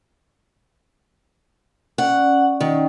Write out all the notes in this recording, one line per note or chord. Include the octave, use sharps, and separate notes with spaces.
C#4 D5 F#5
D#3